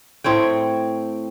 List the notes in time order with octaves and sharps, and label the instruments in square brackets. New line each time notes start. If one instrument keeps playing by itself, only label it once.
[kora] A2 C4 C#5 G5